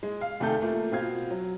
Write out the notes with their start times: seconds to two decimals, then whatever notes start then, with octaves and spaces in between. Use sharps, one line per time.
0.03 G#3
0.21 F5
0.40 F1 C3 D#3 A3 A4 G6
0.62 A3 A#3 F4
0.92 B2 C4 F4 F5 G#6
1.31 F#3